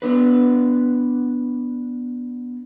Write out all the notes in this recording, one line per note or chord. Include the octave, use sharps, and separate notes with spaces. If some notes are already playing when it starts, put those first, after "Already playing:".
B3 D4 B4